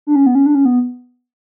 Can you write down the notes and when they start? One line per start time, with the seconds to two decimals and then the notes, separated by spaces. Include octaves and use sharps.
0.07 D4
0.16 C#4
0.26 B3
0.35 C#4
0.46 D4
0.55 C#4
0.65 B3